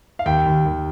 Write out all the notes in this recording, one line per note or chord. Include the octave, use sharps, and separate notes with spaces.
F5
D#2 G5
D#2
D#2